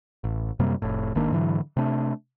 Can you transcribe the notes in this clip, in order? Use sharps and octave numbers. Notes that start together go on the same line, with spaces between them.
A1
F#2 C3 G3 A#3
F1 A2
G#1 D#3 A#3 D4
G#2 D3 E3 F#3
C3 A3 D4